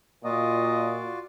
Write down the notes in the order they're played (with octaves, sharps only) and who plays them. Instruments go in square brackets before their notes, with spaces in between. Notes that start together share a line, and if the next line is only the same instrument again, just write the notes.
[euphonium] A#2 [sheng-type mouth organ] F4 F#4 D5 [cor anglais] D#5